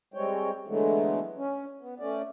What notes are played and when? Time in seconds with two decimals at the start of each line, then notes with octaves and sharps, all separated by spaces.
0.14 G3 G#3 C4 C#5 G5
0.67 D3 E3 F#3 G#3 A3 B3
1.37 C#4
1.81 B3
2.00 A3 C#4 D5